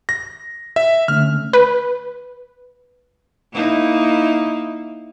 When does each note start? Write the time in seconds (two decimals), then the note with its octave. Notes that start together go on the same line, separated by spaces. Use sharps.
0.09 A#6
0.76 E5
1.08 D3 A3 C#4 F6
1.53 B4
3.53 A#3 D#4 E4